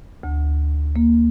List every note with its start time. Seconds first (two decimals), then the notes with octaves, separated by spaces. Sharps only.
0.23 D2
0.96 A#3